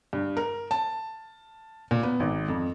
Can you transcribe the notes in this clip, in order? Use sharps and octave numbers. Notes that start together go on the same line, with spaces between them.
G2
A#4
A5
A#2
B3
G#1
F2